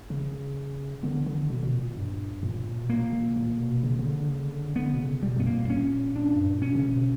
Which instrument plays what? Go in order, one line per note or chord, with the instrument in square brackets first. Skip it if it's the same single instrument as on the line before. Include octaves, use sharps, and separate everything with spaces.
[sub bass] C#3
[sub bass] D3 [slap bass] B3
[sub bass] D3
B2
B2
A#2
G2
A#2
B2
[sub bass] A#2 [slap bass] A#3
[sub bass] A#2
A#2
B2
C#3
C#3
D3
C#3
D3
[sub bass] D3 [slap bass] B3
[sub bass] B2
C#3
[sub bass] B2 [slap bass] G3
[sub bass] G2 [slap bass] B3
[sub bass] A#2 [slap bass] A#3
[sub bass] G2
[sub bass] A#2 [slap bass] C#4
[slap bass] D4
[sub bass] F#2
G2
A#2
[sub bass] B2 [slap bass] C#4
[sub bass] C#3
B2